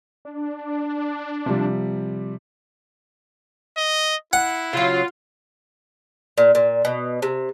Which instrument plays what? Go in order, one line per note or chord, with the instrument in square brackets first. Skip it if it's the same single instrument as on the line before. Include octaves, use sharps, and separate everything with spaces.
[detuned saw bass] D4
[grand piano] C3 F3 G3
[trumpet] D#5
[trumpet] E4 [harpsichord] F#5
[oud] C#3 F#3 [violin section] F4
[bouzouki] A#2
A#2
B2
C3